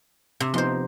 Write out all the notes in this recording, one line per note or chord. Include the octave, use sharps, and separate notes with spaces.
C3
F3 B3 D#4 C5 C6